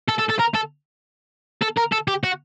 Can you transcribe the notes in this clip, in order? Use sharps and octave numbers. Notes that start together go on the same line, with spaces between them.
A4
A4
A4
A#4
A4
A4
A#4
A4
G4
F#4